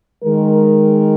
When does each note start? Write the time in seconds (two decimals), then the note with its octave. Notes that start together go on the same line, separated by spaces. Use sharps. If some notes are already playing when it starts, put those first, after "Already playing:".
0.24 D#3 G#3 A#4